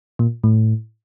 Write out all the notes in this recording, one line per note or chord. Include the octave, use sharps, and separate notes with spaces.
A#2
A2